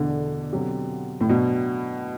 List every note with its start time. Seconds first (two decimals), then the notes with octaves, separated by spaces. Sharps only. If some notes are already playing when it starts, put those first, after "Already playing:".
Already playing: E2 B2 D3 A3 D4
0.52 B2 F#3 C4 G4
1.21 A2
1.29 B2 F#3 B3 D4